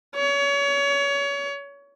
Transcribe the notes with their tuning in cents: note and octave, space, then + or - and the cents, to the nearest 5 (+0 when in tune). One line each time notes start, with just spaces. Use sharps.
C#5 +30